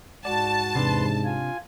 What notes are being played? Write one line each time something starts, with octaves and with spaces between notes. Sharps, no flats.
G#2 F#4 D5 A5
E2 G#2 C3 D4 B4 C6
F4 G#5